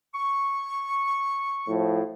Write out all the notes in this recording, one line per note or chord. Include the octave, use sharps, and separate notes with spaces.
C#6
A2 F3